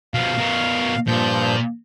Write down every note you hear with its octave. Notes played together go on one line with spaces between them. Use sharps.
B2 F3 F5
B2 A#4
G2 A#2 F3 G6